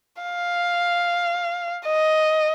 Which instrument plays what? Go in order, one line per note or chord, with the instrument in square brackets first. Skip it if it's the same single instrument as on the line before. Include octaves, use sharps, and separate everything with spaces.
[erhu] F5
D#5